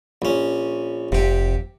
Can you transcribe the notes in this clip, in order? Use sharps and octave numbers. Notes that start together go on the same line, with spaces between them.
A#1 C#4
F1 C3 G4